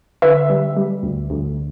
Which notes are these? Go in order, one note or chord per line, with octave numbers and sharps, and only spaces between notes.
D3 B4 E5
G3
G3
D2
D2